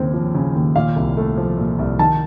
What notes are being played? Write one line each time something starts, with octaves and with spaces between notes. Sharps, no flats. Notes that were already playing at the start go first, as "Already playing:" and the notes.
Already playing: D#2 C#3 C4
F3
C#3
D#2
A#2 F5
C2
A3
F3
A#2
C2
D#3 A5